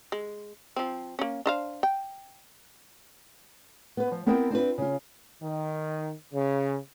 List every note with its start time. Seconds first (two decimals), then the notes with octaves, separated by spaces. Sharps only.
0.12 G#3
0.76 F3 C4
1.19 A#3 C#4
1.46 D4 C5 F5
1.83 G5
3.97 B3 B4
4.12 F3
4.26 B3 C4 E4 A#4 D#5 G5
4.51 C4 D4 F4 B4
4.78 C#3 F4
5.42 D#3
6.33 C#3